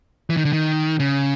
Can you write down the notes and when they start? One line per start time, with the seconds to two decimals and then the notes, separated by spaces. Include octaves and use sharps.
0.30 E3
0.37 D#3
0.45 D3
0.53 D#3
1.00 C#3